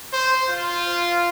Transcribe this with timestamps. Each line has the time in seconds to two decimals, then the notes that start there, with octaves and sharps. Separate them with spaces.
0.13 C5
0.49 F4